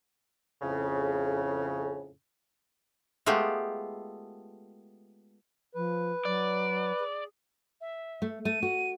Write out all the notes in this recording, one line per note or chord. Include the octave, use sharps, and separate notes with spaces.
F2 A2 C#3
G#3 A3 B3 F4 G4
F3 B4
F#3 D5
G#4
E5
A3
A3 D#7
F#4